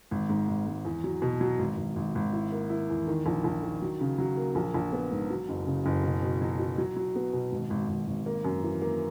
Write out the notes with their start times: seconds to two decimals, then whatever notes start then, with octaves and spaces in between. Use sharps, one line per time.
0.11 G#1
0.29 G#2
0.48 G#1
0.67 G#2
0.85 E2
1.04 F#3
1.22 B2
1.41 F#3
1.59 G#1
1.78 G#1
1.96 G#1
2.15 G#1
2.33 E4
2.52 A#3
2.70 E4
2.89 E2
3.07 D#3
3.26 A#1
3.44 A#1
3.63 D#3
3.82 F#3
4.01 C#3
4.18 F#3
4.37 A#3
4.55 A#1
4.74 A#1
4.93 B3
5.11 G#2
5.30 F#3
5.49 F#1
5.66 C#3
5.86 F#1
6.03 B2
6.23 B2
6.41 F#3
6.59 F#3
6.78 F#3
6.97 F#3
7.15 B3
7.33 B2
7.52 G#1
7.70 G#1
7.89 G#1
8.07 G#1
8.26 A#3
8.45 F#2
8.63 E3
8.82 A#3